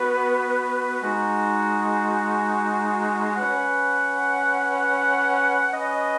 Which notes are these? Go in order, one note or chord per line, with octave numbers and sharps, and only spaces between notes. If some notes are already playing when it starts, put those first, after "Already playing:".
Already playing: B3 F#4 B4
G#3 D#4 F#4
C#4 B4 F#5
C#4 B4 D#5